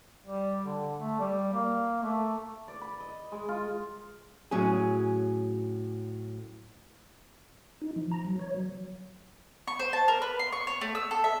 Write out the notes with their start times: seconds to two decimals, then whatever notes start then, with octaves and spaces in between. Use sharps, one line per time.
0.27 G3
0.66 D3
1.01 A3
1.20 G3
1.53 A#3
2.03 A3
2.68 D5
2.81 B5
3.00 D#5
3.32 G#3
3.48 F4
4.51 A2 F#3 C#4 G#4
7.82 D#4
7.96 F3
8.11 A#5
8.25 F#3
8.39 C#5
8.54 F#3
9.68 C#6
9.79 C5
9.93 A5
10.08 A#4
10.22 B4
10.39 C6
10.52 C#6
10.67 C#5
10.81 A3
10.95 E6
11.11 A4
11.24 E5